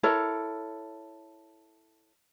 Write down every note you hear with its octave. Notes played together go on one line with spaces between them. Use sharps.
E4 A4 A#4 C#5